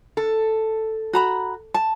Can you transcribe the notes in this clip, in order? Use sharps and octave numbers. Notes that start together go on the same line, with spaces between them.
A4
F#4 A#5 B5
A5